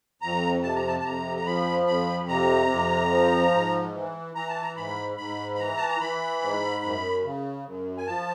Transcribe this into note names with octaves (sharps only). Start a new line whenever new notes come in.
F2 A#5
C3 A5
A#5
A5
A5
F2 A#5
A#5
F3 B5
F2 B5
C3 A#5
F2
F3
G#2
E3
E3 A#5
A5
A#5
G#2 B5
G#2 B5
B5
E3 A#5
A5
A#5
E3 B5
G#2
F#2
C#3
F#2
G#5
F3 A5